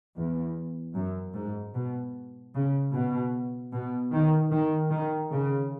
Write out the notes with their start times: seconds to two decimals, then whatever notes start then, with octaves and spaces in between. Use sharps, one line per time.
0.17 E2
0.96 F#2
1.35 G#2
1.75 B2
2.55 C#3
2.94 B2
3.73 B2
4.12 D#3
4.52 D#3
4.91 D#3
5.32 C#3